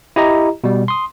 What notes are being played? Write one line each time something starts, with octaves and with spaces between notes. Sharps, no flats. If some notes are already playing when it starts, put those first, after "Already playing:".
E4 G4 D#5 A#5
B2 G3
C6 D#6